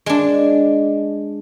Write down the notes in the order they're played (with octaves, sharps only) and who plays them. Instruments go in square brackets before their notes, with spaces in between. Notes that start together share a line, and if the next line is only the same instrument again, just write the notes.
[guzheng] G#3 D4